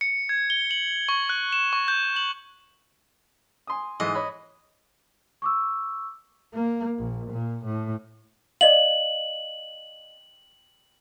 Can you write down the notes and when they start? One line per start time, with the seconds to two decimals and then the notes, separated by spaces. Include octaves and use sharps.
0.01 C#7
0.29 G#6
0.50 G7
0.71 F#7
1.09 C#6
1.29 F#6
1.53 E7
1.73 C#6
1.88 G6
2.16 F#7
3.67 G#5 C6 D#6
4.00 G#2 E3 D#5
4.15 C#5 B5
5.42 C#6 D6 E6
6.54 A#3
6.97 A#1
7.31 A#2
7.65 A2
8.61 D5 D#5 F5 F#7